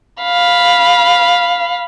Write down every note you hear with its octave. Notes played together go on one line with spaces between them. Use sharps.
F5 B5